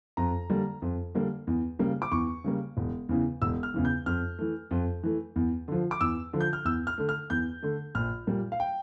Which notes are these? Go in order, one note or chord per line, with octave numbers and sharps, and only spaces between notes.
F2 A#5
D3 G3 A#3
F2
D3 G3 A#3
E2
C#3 G3 A#3
D6
E2 C#6
C#3 G3 A#3
E1
E2 C#3 E3
E1 E6
F6
E2 C#3 E3
G6
F2 F6
E3 A3
F2
E3 A3
E2
D3 F3
D6
E2 E6
D3 F3
G6
F6
E2 E6
F6
D3 A3
F6
E2 G6
D3 A3
A#1 F6
A#2 G3 A#3
F5
G5